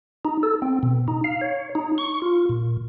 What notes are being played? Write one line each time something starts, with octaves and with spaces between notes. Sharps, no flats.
D#4
A4
C4
B2
D#4
F5
C#5
D#4
C#6
F4
A#2